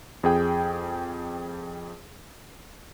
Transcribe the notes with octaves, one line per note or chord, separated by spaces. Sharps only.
F2 G#4 G5